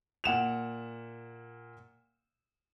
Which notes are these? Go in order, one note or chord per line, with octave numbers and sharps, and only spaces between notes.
A#2 F#5 E7 F7